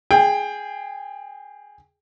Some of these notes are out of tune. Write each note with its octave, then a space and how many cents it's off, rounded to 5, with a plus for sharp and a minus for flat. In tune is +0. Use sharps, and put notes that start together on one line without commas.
G#4 +0 G5 +20